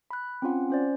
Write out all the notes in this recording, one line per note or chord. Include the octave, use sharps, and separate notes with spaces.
B5 F#6
C4 C#4 F4 F#5
C#4 C5 D5